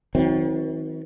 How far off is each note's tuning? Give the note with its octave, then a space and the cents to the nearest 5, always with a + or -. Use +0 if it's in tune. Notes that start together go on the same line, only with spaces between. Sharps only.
D#3 +45 F#3 +0 C4 +0